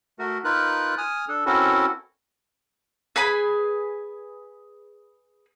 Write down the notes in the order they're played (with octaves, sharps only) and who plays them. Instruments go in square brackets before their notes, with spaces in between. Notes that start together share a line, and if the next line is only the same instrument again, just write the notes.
[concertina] A3 F#4 A#4
D#4 F4 A#4 B4 F#6
G#5 D#6 F6
D4 A4
C4 C#4 E4 F#4 A4 A#4
[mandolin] G#4 B4 G#5 B5